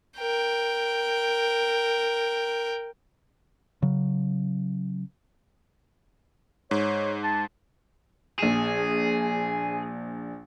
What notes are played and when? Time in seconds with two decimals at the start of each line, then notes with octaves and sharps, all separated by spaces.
0.18 A#4 G5
3.82 C#3 F#3
6.71 G#2 C#5
7.24 A5
8.39 A#1 G#4 E7